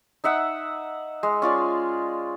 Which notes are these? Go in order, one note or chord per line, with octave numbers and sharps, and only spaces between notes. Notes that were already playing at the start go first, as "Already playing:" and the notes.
D#4 E5 F#5 E6
G#3
C#4 F4 D5